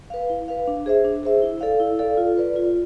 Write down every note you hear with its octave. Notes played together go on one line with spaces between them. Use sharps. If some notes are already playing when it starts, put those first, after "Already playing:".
B4 F5
E4
B4 F5
D4
G#4 C5 E5
D4
G#4 C5 E5
E4
A4 D5 F5
E4
A4 D5 F5
F4
B4 D5
F4